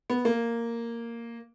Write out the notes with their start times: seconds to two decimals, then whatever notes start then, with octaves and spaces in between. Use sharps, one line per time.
0.10 B3
0.25 A#3